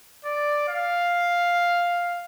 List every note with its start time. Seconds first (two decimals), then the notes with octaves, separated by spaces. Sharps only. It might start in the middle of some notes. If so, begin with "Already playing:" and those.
0.25 D5
0.68 F5